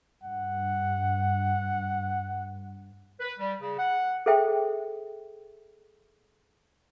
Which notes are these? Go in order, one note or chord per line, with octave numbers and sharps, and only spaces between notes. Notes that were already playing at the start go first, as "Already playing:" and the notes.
G2 F#5
B4
G3
C#3
F#5
G#4 A4 C5 E5 G5